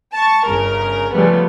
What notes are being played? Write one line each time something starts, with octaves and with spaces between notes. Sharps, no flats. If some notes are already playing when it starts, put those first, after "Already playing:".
A5 C#6
G1 C#3 A#4
C#3 F3 G3 A3 B3